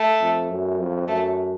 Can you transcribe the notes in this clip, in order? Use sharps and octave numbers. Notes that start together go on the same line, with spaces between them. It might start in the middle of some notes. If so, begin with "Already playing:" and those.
Already playing: A3
F2
F#2
F2
F#2 A3